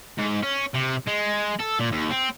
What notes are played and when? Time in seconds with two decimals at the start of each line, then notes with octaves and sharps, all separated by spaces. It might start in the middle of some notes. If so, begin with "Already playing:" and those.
0.18 G#2
0.43 C#4
0.74 C3
1.07 G#3
1.60 A4
1.79 A#2
1.92 D#2
2.10 C4